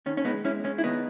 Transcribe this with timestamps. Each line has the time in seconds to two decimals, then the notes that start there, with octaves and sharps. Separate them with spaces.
0.06 D#3 C#4
0.17 C#4
0.25 G#3 B3 D#4
0.44 G#3 C#4 E4
0.64 G#3 C#4
0.78 E4
0.83 D#3 B3 D#4